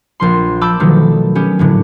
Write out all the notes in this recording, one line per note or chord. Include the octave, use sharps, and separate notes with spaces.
A#1 F3 C6
A5 B5 D6 E6 G6
B2 D#3 F3 F#3 A3
B3 C#4 G4
A2 D3 F#3